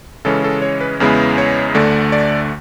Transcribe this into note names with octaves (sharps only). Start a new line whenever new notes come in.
C#3 E3 G#3 C#4 A4
A4
C#5
B4
E2 C#3 G#3 B3 E4 B4
C#5
D2 D3 A3 D5
D5